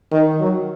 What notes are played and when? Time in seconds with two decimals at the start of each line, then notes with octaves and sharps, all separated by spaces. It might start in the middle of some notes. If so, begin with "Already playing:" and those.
0.12 D#3
0.40 F#3